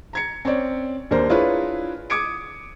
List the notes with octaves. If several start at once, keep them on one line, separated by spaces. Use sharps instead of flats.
A#5 G#6 C#7
C4 C#4 C#5 D5
D#2 D4 A#4 C5
D4 E4 F4 G#4 B4 C#5
D6 D#6 G#6 C#7 D7